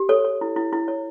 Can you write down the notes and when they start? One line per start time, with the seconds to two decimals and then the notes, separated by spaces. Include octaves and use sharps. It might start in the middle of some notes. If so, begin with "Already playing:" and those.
Already playing: G4
0.09 A4 C#5
0.24 C#5
0.41 E4
0.56 E4
0.73 E4
0.88 C#5